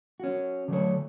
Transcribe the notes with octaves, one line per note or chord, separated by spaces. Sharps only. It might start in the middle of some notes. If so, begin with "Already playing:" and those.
C#4 F#4
D3 F#3 A3 C#5